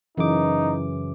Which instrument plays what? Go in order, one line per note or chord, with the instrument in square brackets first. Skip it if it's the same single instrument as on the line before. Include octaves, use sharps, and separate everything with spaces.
[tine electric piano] F#2 C#3 D6 [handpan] E3 [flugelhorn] D#4